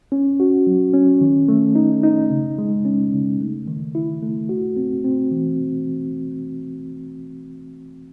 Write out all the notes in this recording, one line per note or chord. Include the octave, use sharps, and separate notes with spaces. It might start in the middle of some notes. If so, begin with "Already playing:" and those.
C#4
F#4
F#3
C#4
D#3
A3
D#4
D#4
C#3
G#3
C#4
C#3
A3
D#3
E4
A3
F#4
C4
C4
E3